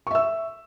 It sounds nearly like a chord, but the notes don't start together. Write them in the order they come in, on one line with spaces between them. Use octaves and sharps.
C#6 E5 E6